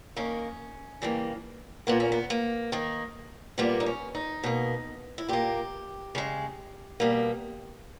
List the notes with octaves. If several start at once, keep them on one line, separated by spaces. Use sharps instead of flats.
D#3 A#3 C#4
C#3 E3 G3 A#3
A#2 A#3 B3
C#4
B3
A#3
D#3 A#3
A#2 G3 A#3 B3
D#4
C#4
D#4
B2 A#3
E4
A#2 A#3 G4
C#3 G#3
B2 G3 A#3